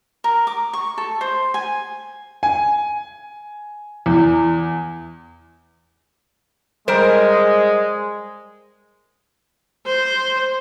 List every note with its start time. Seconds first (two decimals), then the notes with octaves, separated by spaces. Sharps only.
0.24 A#4
0.47 D6
0.73 C#6
0.98 A4
1.21 C5
1.54 G#5
2.43 G#5
4.06 E2
6.88 G3 G#3 A#4 C5
9.87 C5